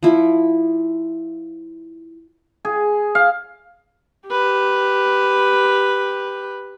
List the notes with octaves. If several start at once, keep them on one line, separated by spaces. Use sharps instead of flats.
F3 E4
G#4
F5
G4 B4